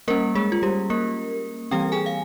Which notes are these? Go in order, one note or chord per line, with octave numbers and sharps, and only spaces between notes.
G3 A#3 C#4 A#4
G#3 G#4
F4
G3 G4
A#3 A#4
E3 G3 C4 G4 G5
G#4 G#5
F5